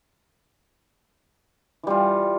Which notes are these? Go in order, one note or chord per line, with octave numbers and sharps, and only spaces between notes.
E3 G3 F4